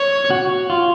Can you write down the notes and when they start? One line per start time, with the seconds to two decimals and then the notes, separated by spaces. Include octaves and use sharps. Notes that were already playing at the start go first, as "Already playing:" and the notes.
Already playing: C#5
0.30 F#4
0.70 F4